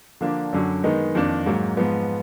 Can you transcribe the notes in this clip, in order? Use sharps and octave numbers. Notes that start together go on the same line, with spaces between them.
D3 F3 A#3 D4
F#2 D3 F#3
D#3 G#3 B3 D#4
F2 D#3 A#3 D4
G#2 F#3 A#3
G#2 F3 B3